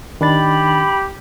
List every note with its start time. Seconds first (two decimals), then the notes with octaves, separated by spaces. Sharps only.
0.21 D#3 D4 G4 B5 A6